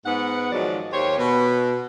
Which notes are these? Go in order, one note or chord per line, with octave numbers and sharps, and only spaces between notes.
G#2 B3 F#5
G#2 D#3 F3 F#3 D#4 D5
D#2 G4 C5 C#5
B2 B3